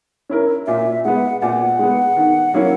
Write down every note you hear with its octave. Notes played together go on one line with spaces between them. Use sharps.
C#4 E4 A#4
A#2 E5
G#3 B3 F#5
A#2 F#5
G#3 B3
D#3
F#3 A#3 C#4 E4